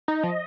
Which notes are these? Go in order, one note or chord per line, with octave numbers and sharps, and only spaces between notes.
D#4 D#5
F3